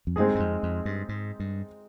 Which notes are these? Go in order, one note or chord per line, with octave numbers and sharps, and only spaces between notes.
F2
G2 G#3 C4 D#4 G#4
G2
F2
F2
G2
G#2
G2